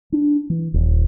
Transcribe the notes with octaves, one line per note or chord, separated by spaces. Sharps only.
D4
E3
D#1